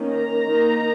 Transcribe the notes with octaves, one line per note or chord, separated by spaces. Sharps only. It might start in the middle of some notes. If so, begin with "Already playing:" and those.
Already playing: D#3 A#3 C#4
A#5
D#3 A#3 D#4